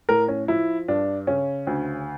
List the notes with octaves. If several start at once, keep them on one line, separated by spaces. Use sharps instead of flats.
A2 A#4
C#4
F3 E4
G2 D4
C#3 C#4
D2